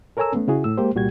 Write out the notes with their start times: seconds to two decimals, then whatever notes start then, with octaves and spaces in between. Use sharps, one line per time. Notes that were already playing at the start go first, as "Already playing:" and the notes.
0.17 A4 A#4 C#5 G#5 A#5 E6
0.33 A3 B3 C#4
0.48 C#3 E4 F#4 G#4
0.64 A2 E6
0.77 G#3 A#3 G4 C5
0.95 C2 A#2 G3 F#4 G4 G#6